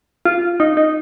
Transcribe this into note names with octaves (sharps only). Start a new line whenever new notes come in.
F4
D#4
D#4